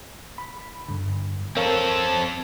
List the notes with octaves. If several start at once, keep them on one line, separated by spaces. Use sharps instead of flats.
B5
G2 D3
C4 A4 A#4 C#5 F5